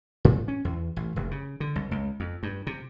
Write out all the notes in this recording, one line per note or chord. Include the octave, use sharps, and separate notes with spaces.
A2
C#4
E2
A1
F1
C#3
D3
C2
C#2
F2
G2
C3